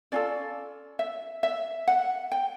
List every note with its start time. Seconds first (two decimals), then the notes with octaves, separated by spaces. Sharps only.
0.12 C#4 F4 A4 D5
0.99 E5
1.43 E5
1.88 F#5
2.32 G5